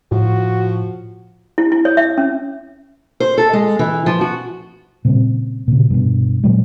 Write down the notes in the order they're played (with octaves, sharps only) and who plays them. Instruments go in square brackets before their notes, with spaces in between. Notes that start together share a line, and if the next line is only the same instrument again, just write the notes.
[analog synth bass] A2 [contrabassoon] F3 [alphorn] F#4
[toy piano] E4
E4
C#5
E5
C#4
[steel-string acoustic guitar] C5
A4
G#3
E3
F3
F#4
[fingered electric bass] A#2 C#3 G3 C4
A#2 C#3
G2 B2
A#2 F#3 G#3